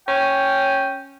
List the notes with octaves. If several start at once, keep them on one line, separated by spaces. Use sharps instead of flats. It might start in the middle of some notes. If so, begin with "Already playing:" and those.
C#4 G5